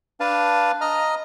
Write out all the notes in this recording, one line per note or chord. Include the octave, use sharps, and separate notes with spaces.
D4 B4 F5 A5
D#5 A#5 F6